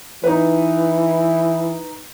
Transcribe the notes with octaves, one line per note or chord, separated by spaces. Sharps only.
E3 D#4 B4